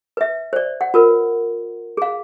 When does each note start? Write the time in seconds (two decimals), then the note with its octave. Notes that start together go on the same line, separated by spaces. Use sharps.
0.17 B4 E5
0.53 C5 D5
0.81 F#5
0.94 F4 A#4 B4
1.97 G#4 F5